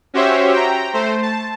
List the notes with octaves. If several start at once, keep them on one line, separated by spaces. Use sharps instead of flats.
C#4 F#4 G4 C5 C#5 E5
G5 A#5
A3 C5
A5